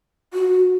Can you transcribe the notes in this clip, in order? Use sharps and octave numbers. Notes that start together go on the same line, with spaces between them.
F#4